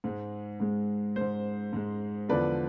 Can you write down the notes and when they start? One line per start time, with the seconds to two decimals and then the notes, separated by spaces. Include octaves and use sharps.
0.04 G#2 G#3
0.60 G#2 G#3
1.16 G#2 G#3 C5
1.73 G#2 G#3
2.29 E2 D3 F3 B4 D5